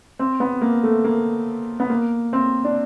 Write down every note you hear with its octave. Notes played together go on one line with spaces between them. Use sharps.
C4
B3
A#3
A3
A#3
B3
A#3
C4
D4